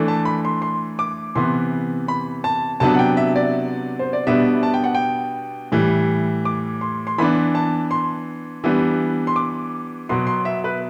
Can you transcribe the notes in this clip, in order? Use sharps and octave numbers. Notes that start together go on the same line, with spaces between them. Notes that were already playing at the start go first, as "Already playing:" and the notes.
Already playing: E3 A3 D4
A5
B5
C6
C6
D6
C3 E3 B3 C6
B5
A5
C3 F#3 B3 D4 A5
F#5
G5
E5
D5
C5
D5
B2 G3 B3 D4 E5
A5
G5
F#5
G5
A2 E3 G3
D6
C6
C6
E3 B3 D4 B5
A5
C6
E3 G3 B3 D4
C6
D6
B2 F#3 B3 C6
C6
E5
B4